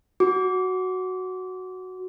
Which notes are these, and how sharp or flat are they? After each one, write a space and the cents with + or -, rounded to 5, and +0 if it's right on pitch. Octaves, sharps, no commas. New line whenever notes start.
F#4 +0 D6 -25